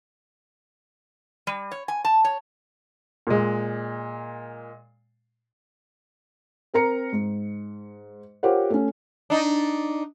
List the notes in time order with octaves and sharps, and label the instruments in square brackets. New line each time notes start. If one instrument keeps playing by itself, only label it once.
[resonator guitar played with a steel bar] G3
C#5
G#5
A5
C#5
[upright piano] A#2 G#3
[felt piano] C4 A#4 A#5 C#7
G#2
F4 G4 A#4 C5 C#5 F#5
A3 C#4
[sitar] D4 D#4